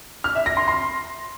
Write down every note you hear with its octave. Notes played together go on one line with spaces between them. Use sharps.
F6
E5
A#6
C6
C6